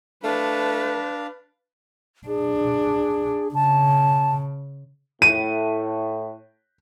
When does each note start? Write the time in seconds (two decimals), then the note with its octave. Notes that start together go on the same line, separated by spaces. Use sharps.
0.24 A3 D4 B4 F5
2.28 D4 G#4
3.55 C#3 A5
5.22 A2 D#7